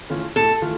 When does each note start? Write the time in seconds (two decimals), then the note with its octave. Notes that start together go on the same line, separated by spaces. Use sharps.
0.10 E3 A3 C#4 F4
0.36 A2 A4
0.62 E3 A3 F4